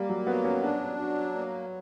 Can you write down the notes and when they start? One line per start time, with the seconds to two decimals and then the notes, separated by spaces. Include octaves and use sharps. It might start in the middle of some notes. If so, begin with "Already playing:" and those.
Already playing: G3 A#3
0.09 F#3
0.26 F#3 B3
0.44 C#4
0.63 D4 F#4
0.98 F#3
1.35 A#3